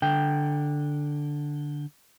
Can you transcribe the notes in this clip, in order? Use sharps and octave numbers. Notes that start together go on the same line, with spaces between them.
D3 G5